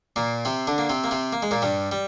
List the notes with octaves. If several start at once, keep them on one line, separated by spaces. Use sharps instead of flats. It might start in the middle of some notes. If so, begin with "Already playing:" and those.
A#2 A#3
C3 C4
D3 D4
A#3
C3 C4
A#3
C3 C4
A#3
G#3
A#2 A#3
G2 G3
G3